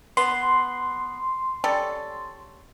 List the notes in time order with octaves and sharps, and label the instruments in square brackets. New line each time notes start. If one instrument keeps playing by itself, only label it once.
[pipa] B3 [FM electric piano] C6
[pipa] G3 C#4 A4